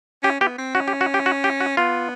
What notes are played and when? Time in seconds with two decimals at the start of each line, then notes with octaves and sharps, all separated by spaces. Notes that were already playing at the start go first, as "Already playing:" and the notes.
0.23 C#4 G4
0.41 B3 G4
0.58 C4
0.75 C#4 F#4
0.88 G4
1.01 F#4
1.14 G4
1.26 F#4
1.44 G4
1.60 F#4
1.77 B3 F4